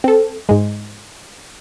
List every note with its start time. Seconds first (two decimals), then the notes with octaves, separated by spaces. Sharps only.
0.04 C4 A4
0.49 G#2 G#3